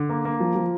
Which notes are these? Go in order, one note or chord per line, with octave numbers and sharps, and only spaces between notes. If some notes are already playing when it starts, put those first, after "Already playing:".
Already playing: D3
A#3
A#3
F3
F3